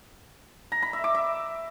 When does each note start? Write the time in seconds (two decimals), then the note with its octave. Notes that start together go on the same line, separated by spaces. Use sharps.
0.72 A#5
0.82 B5
0.93 E5
1.04 D6
1.15 E5